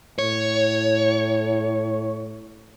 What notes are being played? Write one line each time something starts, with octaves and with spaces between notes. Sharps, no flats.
A2 C#5